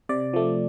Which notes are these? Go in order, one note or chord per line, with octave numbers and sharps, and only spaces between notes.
C3 D5
F3 A3